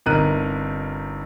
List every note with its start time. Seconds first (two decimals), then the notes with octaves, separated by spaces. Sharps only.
0.06 G1 C3 D#4 A#4 F#6 D#7